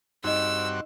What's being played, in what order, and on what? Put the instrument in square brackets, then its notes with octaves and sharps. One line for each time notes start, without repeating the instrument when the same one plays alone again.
[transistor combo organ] G2 C4 F#4 [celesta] D#4 D#5 [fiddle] E6